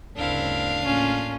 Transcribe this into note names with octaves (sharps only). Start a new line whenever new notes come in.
G1 D2 C#3 C4 D4 E4 A#4 F5
A1 A3 A#3 C#4 F4